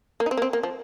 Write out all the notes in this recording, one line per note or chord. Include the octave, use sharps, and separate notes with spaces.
A#3
D#4
C4
A#3
C4
A#3
F3